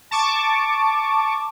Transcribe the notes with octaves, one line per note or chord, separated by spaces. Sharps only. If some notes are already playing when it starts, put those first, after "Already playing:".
A5 C#6 D6